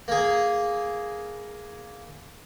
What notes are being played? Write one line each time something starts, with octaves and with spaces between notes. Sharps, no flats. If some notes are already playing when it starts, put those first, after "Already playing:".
A#3 G#4